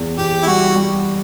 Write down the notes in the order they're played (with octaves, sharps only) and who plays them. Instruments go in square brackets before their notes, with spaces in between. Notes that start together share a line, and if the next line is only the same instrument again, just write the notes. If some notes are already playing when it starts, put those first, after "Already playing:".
Already playing: [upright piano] E2
[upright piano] E2 [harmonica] G4
[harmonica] E4
[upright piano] G3 [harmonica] F#4
[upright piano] G3